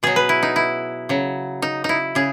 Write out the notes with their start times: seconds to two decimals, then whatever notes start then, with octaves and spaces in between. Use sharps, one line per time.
0.03 B2 F#3 G#4
0.16 B4
0.29 E4
0.43 D#4
0.56 E4
1.09 C#3 F#3
1.62 D#4
1.84 D#4 E4
2.15 C#3 G#4